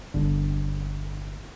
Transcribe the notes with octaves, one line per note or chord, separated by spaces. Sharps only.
G1 D3